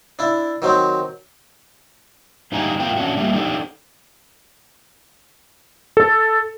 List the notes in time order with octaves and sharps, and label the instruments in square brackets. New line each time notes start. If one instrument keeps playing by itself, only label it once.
[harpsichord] D4 E4
D#3 F#3 C4
[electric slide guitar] G2 D3 D#4 G4 G#5 A#5
G2 A3 B3 F4 A#4 G5
B2 C#4 D4 F#4
G3 A3 A#3 F4 G4
D4 D#4 G4 A4
[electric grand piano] A4